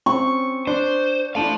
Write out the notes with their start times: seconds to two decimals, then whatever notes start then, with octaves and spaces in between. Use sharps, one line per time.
0.06 C4 C#4 C#6
0.67 D4 C5
1.35 A3 D4 E4 F5 A5